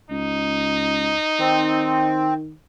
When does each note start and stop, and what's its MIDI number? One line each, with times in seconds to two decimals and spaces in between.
0.10 1.15 37
0.10 2.11 63
1.39 2.54 51
1.39 2.34 60